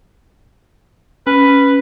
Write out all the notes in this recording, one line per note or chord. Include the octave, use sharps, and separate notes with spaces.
C#4 B4